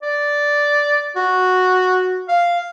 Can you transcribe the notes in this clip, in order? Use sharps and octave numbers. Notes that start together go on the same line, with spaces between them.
D5
F#4
F5